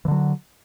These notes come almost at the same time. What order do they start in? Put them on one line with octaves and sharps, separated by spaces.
E3 D3 F#3